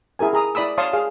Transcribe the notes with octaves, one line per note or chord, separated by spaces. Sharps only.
E4 G#4 A#4 G#5
G#4 A#5 D#6
E4 D5 B5 D#6 E6
C#5 F5 A5 C6 C#6 D#6
G#4 F5